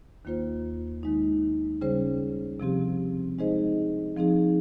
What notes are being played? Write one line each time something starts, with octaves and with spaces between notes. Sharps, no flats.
D#2 D#3 A#3 F4 C5
D#3 G#3 D#4
C#3 G3 C#4 G#4 C5
C3 F3 C4 G4
G#3 D#4 G#4 C5 D#5
F3 C4 D#4 G#4